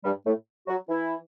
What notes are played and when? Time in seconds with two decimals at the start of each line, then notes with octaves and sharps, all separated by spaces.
0.04 G2 G3
0.26 A2 A3
0.67 F#3 F#4
0.89 E3 E4